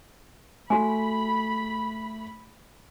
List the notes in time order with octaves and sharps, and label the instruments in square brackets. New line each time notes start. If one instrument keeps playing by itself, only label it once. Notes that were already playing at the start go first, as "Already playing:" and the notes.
[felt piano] A3 [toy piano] F#4 G#5 [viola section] B5